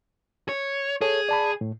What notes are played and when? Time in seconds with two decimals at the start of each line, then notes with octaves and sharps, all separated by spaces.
0.49 C#5
1.01 G#4 A4 C#5
1.29 D5 A5 B5
1.61 A2